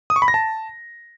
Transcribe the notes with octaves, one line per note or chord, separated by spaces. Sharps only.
D#6
C#6
B5
A#6
A5